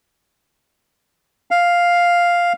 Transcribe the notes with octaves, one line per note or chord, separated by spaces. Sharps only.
F5